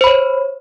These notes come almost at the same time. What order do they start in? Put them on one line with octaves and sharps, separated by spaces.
C5 B5 C#5